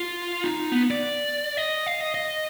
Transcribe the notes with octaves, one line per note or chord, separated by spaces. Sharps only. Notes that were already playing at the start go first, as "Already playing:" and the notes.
Already playing: F4
D#4
B3
D5
D#5
F5
D#5
D#5